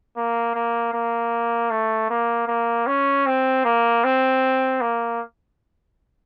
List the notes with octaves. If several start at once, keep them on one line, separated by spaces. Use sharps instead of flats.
A#3
A#3
A#3
A3
A#3
A#3
C#4
C4
A#3
C4
A#3